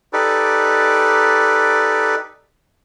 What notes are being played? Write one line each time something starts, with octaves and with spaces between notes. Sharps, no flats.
D#4 G4 A4 B4 D5